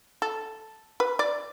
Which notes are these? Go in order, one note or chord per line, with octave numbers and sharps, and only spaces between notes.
A4
B4
D5